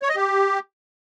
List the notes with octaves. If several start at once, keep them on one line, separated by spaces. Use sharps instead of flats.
C#5
D#5
G4